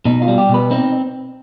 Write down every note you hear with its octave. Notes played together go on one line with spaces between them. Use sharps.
B2 D#4
F4
G3
G4
B2 B4
C4 D#4